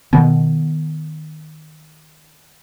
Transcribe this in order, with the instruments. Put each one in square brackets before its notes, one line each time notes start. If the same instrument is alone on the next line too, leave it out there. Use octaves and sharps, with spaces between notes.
[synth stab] B2 [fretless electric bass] D#3 B3